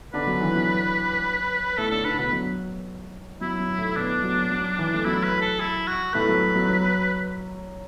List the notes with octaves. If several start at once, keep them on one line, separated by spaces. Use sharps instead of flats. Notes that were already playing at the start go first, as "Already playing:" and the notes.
D3 D4 B4
F#3
E3
F#3
A2 A3 A4
D3 D4 A4
D3 D4 B4
B2 B3 B4
F#3
F#3 E4
F#3
A2 A3
B2 B3 D4
F#3
F#3
E3
A3
F#3 E4
B4
A4
E4
F#4
A2 A3 B4
F#3
F#3
F#3